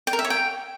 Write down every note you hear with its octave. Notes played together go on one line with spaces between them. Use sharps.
G5
A#4
E5
C#5
G5